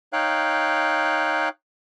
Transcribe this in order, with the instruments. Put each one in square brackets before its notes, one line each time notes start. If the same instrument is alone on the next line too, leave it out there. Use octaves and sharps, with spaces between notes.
[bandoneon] D#4 C#5 F5 G5 F#6